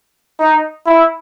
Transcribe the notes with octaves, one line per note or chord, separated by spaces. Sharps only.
D#4
E4